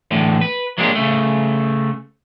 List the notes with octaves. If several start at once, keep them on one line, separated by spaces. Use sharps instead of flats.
E2 A2 D3
B4
F#3 G#3 A#3 D4 G4
C#3 A3